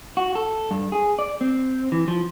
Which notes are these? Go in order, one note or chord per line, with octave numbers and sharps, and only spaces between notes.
F#4
A4
G2
G#4
D5
C4
E3
F3